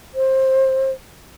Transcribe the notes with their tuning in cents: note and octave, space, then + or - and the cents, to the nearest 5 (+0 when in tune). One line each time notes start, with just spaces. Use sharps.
C5 +20